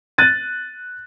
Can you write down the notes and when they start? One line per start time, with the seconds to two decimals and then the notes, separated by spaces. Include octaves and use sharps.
0.18 F#6 A6 D#7